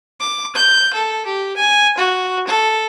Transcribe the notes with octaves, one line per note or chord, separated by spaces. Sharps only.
D6
G6
A4
G4
G#5
F#4
A4